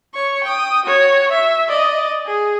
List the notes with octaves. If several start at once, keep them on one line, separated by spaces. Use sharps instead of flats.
C#5 C#6
G5 D#6
F#4 C#5
E5
D5 D#5
G#4